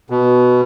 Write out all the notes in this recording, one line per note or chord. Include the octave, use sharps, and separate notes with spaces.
B2